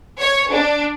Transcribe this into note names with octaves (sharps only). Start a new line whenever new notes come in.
C#5
D4